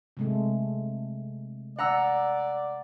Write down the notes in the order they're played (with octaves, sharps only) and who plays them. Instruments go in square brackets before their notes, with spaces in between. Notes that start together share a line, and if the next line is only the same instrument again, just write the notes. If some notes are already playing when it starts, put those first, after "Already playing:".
[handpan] C3 G#3 A3
[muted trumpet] D5 [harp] F#5 A#5 E6